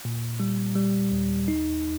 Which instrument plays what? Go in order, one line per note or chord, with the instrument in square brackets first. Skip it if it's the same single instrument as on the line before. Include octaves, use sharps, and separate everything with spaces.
[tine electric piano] A#2
G3
G3
D#2
D#4